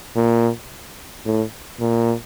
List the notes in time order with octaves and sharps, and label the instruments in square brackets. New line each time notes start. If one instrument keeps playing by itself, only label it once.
[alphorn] A#2
A2
A#2